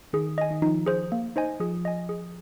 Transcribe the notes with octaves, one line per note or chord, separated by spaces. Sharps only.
D#3 G#4
D#5 G#5
D#3
F3 D#4
G#4 C5
A#3
D#4 C5 D#5 G#5
F3 G#4
D#5 G#5
G#4